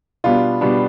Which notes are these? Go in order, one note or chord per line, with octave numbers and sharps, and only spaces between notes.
B2 G3 B3 D4 F4
B2 G3 B3 D4